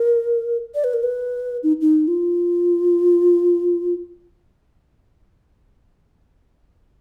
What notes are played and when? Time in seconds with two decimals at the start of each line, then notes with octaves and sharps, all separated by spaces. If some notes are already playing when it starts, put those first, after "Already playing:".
Already playing: A#4
0.75 D5
0.84 B4
0.94 A#4
1.03 B4
1.63 D#4
1.81 D#4
2.08 F4